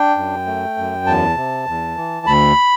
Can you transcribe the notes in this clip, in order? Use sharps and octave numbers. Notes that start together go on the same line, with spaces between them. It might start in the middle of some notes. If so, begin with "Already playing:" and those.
Already playing: D4 G5
F#2
A3
F#2
E2 A5
C3
E2
E3
D2 B5